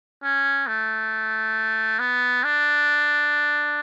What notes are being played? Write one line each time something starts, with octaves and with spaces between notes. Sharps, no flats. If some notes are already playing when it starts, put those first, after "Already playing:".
C#4
A3
B3
D4